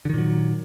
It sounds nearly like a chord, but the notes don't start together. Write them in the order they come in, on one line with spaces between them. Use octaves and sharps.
D3 D#3 A#2 F#3